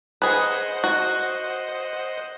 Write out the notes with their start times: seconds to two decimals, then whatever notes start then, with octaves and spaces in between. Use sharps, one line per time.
0.22 G#4 B4 C5 D#5 F#5
0.84 F#4